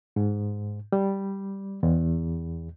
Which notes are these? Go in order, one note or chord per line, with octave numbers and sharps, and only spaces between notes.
G#2
G3
E2